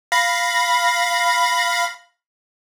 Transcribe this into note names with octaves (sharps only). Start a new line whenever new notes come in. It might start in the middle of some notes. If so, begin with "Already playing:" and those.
F5 B5 A#6